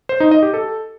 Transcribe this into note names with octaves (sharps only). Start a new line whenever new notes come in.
C5
D#4
D#5
G4
A4